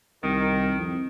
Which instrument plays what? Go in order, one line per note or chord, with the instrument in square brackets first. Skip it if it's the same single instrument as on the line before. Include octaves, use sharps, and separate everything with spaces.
[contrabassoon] C2 [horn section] D#3
[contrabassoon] F2